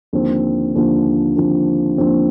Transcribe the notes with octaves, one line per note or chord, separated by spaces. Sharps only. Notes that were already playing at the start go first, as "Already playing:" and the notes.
D#2 D3 F3 C4
D#2 D3 F3 C4
D#2 D3 F3 C4
D#2 D3 F3 C4